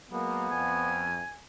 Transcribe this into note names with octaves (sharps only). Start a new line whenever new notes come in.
F#3 G#3 A#3 B3
F2 G#5